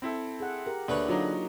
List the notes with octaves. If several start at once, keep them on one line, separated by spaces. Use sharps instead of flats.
C4 E4 A4
G#4 F#5
G4 A#4
D2 D3 A#3 B4 C#5
F#3 D4 D#4 F4 F#4